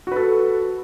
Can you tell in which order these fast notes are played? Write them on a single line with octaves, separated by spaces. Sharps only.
F#4 B4 A4